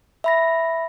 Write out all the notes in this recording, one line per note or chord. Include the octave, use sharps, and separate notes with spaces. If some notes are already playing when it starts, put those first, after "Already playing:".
E5 B5 A#6